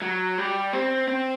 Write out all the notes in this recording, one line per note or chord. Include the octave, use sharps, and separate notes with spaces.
F#3
G3
C4
C4